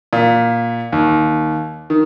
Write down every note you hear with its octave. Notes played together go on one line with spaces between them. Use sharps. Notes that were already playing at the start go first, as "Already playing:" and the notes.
A#2
D#2
D#3